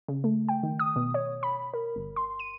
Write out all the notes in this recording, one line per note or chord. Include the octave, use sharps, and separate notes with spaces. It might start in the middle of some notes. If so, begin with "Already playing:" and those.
C#3
A3
G5
D#3
D#6
B2
C#5
B5
A#4
G1
C6
D#7